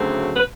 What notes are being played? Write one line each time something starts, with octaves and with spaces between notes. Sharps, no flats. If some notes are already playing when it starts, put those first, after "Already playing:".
Already playing: D2 C#3 F#3 A3 C4
B4